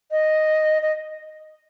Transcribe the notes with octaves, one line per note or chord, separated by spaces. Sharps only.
D#5
D#5